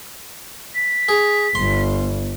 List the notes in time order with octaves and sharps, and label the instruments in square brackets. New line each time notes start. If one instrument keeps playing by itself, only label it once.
[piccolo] B6
[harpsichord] G#4
[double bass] G1 [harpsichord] C6